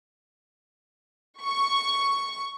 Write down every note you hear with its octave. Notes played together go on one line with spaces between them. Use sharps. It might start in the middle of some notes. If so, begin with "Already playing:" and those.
C#6